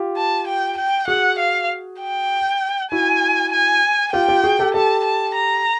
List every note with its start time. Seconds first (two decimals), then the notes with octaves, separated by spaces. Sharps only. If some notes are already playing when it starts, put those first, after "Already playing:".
Already playing: F4 G4
0.17 A5
0.48 G5
0.78 G5
1.08 F#4 G#4 F#5
1.39 F5
2.00 G5
2.92 E4 F#4 G#5
3.53 G#5
4.13 F4 G4 G5
4.28 F4 G4
4.44 F#4 G#4
4.59 G4 A4
4.74 G4 A4 A5
5.05 A5
5.36 A#5